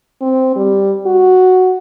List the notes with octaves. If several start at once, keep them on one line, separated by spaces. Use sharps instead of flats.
C4
G3
F#4